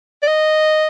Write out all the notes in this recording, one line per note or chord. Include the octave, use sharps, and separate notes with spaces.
D5
D#5